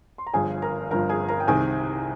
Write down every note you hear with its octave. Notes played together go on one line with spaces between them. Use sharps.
C6
A#5
G1 G2 F3 G#4 G#5
A#4 A#5
G1 G2 F3 A#4 A#5
G#4 G#5
A#4 A#5
G5
C2 C3 D#3 G#4 G#5